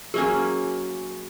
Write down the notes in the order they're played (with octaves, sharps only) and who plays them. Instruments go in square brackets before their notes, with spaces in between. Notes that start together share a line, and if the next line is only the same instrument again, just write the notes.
[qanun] F#3 A#3 C#4 [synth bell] G#4